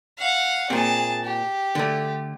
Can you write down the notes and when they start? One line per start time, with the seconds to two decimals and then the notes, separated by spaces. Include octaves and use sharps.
0.19 F5 F#5
0.70 A#2 C4 G#4 A5
1.24 G4
1.75 D3 A3